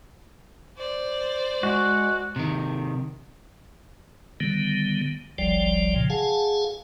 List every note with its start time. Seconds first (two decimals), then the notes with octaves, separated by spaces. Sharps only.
0.77 C5 D5
1.63 G#3 F#4
2.36 C3 D#3
4.40 D3 D#3 G3 B3
5.38 F#1 C2 F3 G3 D5 G5
5.96 A#2 C#3 F3
6.10 G#4 F5 F#5 G#5 A5